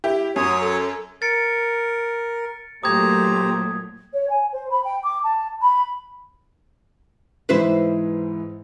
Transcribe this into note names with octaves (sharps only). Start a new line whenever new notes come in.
E4 G4
F#2 F#3 C#5 D#6
A4
A#4 A6 C#7 D7
A#2 F#3 A3 G4 C5 A#5 D#6 G#6
C#5
G#5
C5
B5
G5
D6
A5
B5
G#2 E3 E4 B4 C5 E5